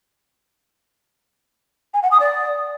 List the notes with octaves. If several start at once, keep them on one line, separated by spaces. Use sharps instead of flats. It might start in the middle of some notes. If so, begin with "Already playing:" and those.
G#5
F#5
D#6
D5